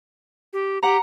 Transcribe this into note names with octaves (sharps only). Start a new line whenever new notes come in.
G4
G4 F#5 A#5